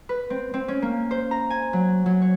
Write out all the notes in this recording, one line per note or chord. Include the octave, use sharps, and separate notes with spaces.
B4
C4
C4
C#4
A#3
C5
A#5
G#5
F#3
F#3
C#5